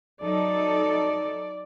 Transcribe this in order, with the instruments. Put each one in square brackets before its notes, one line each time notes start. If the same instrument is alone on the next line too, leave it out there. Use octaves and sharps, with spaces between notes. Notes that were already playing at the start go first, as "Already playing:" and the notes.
[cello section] F#3 D#4 A4 [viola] D5